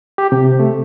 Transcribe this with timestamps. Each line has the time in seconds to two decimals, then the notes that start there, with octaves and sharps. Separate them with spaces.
0.18 G4
0.32 C3
0.59 A3